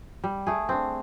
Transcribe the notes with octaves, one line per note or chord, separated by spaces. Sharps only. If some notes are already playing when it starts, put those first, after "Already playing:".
G3
A3 G#4
C4 D4